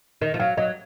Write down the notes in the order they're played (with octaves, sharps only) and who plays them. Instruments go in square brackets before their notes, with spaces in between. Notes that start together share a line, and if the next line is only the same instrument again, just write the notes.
[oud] D#3 [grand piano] D#5
[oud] F3
[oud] F#3 [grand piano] F5
[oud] F#3 [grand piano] D#5